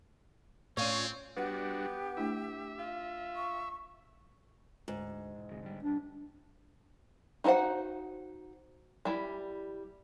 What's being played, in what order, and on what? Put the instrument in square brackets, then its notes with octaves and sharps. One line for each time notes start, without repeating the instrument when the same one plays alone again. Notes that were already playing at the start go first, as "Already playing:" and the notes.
[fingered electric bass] A2 [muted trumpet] C4 [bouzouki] C#4 F4 C#5
[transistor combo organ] G3 D4 F#4 [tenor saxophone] B3 [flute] G4 [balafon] B4 F#5
[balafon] A3 D4 E4 [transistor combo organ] E5
[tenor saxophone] F4
[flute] C#6
[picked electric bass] D2 [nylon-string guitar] G#2
[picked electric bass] E1
D2 C3 G#3
D3 G3
[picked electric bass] B1 G3 [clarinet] D4
[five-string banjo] D#4 E4 F#4 C5 F#5
G3 E4